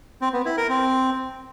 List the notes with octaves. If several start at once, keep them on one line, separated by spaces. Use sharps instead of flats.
C4
B3
E4
A#4
C4